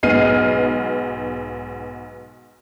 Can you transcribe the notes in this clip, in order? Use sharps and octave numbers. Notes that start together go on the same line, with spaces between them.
B1 G#2 B3 F6 C7 D#7